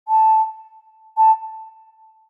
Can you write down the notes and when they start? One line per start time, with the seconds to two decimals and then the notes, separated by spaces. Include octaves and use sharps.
0.08 A5
1.17 A5